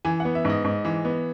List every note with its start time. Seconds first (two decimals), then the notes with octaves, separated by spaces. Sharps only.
0.05 E3 G#5
0.20 B3 F#5
0.35 E5
0.45 G#2
0.50 D#5
0.65 G#2
0.85 E3
1.05 B3